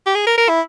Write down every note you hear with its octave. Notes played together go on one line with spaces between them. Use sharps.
G4
G#4
A#4
A#4
E4